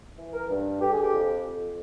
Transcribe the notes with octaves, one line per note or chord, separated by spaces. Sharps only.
E3
A#4
G2
D3 G4
G#4
G4
F2
F2